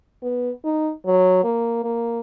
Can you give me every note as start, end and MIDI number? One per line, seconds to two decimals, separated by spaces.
0.23 0.51 59
0.64 0.91 63
1.06 1.41 54
1.44 1.81 58
1.84 2.21 58